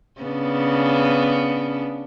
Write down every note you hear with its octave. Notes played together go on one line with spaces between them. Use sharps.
C#3 B3 D4